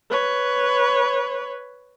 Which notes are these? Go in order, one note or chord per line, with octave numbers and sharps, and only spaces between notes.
B4 C#5